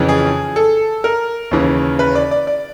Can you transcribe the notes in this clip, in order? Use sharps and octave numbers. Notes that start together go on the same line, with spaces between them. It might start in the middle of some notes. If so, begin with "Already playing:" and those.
Already playing: F2 C#3 E3
G#4
A4
A#4
D#2 C#3 E3
B4
D5
D5
D5